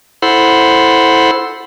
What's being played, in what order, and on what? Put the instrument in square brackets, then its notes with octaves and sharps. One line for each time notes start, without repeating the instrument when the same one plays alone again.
[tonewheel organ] E4 A4 C5 F#5 B5 C6